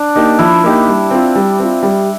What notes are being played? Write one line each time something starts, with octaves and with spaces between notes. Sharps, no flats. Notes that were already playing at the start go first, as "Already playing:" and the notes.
Already playing: D4
A#3 D#4 G4
F3 E4
A#3 D#4 G4
G3
C4 F4
G3
C4 F4
G3